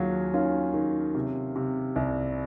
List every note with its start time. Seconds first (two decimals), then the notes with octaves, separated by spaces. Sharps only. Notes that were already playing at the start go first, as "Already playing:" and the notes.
Already playing: D#2 F#3 F4 G#4
0.33 D#3 C#4 F4
0.74 D#3
1.15 C3
1.56 C3
1.96 C2